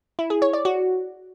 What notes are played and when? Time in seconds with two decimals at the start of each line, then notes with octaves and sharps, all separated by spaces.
0.19 E4
0.30 G#4
0.42 C#5
0.53 D5
0.65 F#4